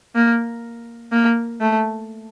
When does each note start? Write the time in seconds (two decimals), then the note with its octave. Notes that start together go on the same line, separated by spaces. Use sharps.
0.15 A#3
1.12 A#3
1.61 A3